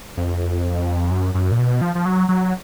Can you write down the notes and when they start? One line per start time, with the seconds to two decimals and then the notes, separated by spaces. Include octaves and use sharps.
0.17 F2
1.11 F#2
1.34 F#2
1.52 A#2
1.59 B2
1.81 F3
1.95 F3
2.06 F#3
2.29 F#3